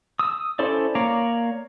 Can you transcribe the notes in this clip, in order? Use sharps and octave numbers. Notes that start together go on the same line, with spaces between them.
D#6 E6
C#4 E4 A4 C5 D5
A#3 C#5 D5 F5 A#5